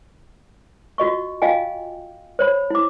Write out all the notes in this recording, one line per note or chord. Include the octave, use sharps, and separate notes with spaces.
F4 F#4 D#5 C#6
F4 D#5 F5 G5 G#5
C5 C#5 B5
E4 D6